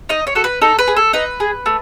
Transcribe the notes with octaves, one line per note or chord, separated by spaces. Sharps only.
D#4 D#5
C#5
F#4 A4
B4
D#4 A4
B4
G#4
A4
D#4 B4
G#4
A3